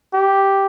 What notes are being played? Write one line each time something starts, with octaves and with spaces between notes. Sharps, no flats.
G4